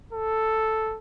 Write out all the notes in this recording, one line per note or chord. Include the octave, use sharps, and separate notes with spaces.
A4